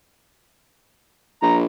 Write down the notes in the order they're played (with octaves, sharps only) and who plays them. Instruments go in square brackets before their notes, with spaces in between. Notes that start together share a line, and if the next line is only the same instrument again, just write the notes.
[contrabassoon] A#1 [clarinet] A#5